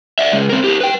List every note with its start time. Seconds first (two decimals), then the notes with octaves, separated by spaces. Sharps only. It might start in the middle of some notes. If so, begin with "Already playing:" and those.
0.19 D5 E5
0.32 C#3 G#3
0.49 C4 A#4
0.64 G4 A#4
0.81 B4 G5